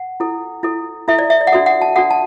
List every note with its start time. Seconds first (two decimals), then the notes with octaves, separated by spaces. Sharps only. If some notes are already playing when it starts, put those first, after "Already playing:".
Already playing: F#5
0.20 E4 A4
0.63 E4 A4
1.08 E4 A4 E5
1.19 D5
1.30 E5
1.41 D5
1.47 F#5
1.52 D4 F#4 A4 E5
1.66 F#5
1.82 A5
1.96 D4 F#4 A4 F#5
2.11 A5